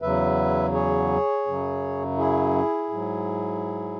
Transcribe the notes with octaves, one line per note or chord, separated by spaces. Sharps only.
E2 C#3 F#3 B4 E5
G#4 C#5
F#2 C#3 F#3
E4 G#4
G#2 F#3